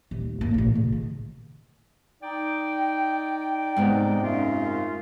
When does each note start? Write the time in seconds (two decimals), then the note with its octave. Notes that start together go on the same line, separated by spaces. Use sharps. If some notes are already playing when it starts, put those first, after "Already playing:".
0.11 D#1
0.41 G#2 A#3
0.54 A1 A#2
0.75 C#3
0.92 D#3
2.23 D#4 D5 G5
3.77 G#2 C3 B3
4.22 F#2 A3 F4